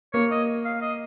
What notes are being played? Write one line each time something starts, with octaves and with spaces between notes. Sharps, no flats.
A#3 C#5
D#5
F5
D#5